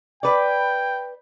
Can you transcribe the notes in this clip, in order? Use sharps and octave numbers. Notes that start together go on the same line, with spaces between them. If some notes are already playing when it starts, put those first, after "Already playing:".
B4 D5 G5